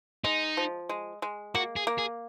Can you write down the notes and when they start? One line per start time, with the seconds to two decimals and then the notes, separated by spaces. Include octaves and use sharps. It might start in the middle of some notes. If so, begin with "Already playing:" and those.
0.24 G#3 D#4
0.57 F3
0.89 G#3
1.22 G#3
1.55 A#3 F#4
1.76 G#4
1.87 A#3
1.98 G#4